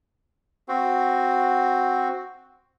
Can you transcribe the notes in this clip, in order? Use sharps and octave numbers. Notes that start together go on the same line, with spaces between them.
C4 F#4